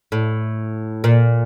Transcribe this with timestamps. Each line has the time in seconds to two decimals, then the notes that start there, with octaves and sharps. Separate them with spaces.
0.12 A2
1.04 A#2